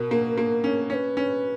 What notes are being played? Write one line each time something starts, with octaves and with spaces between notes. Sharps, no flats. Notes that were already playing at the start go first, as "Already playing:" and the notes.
Already playing: B2 A#4
A#3
A#3
C#4
C#4 B4 C#5
C#4